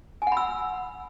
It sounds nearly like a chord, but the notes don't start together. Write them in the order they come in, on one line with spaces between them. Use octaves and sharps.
G#5 F#5 B5 E6